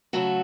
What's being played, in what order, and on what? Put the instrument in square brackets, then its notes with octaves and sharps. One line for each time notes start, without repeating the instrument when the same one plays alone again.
[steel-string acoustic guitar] C#3 F#3 A3 F#4 A4